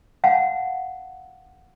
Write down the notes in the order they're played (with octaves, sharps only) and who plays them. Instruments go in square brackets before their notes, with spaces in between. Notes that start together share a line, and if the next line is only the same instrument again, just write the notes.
[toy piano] F5 F#5 A5